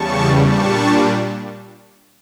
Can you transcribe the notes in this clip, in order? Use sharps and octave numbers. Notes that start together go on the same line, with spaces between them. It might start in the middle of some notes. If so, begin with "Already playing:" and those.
Already playing: E2 C#3 G3 A5 C#6
A#2 G3 D4 A5 C#6